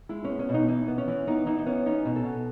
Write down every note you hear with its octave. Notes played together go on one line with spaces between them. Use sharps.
G#3 E4
B3 C#4
C#4
B2
D#4
E3 D#4
B3
C#4
E3
B3 D#4
E3 D#4
D#4
B3 C#4
C#4 D#4
B2
A4
B2